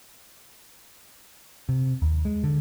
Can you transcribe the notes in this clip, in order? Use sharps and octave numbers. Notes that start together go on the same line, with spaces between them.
C3
D#2
G#3
D3